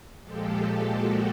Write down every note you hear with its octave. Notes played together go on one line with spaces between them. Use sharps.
A#2 F3 G#3 G4 A4
F#4